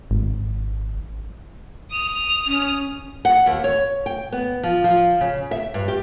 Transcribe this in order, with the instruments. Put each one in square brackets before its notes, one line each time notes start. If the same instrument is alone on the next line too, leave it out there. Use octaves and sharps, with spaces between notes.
[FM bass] G#1
[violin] D#6 F7
[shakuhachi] C#4
[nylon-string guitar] F#5
D#2
C#5
G5
B3
F3
F3
C#3
E5
G2
G4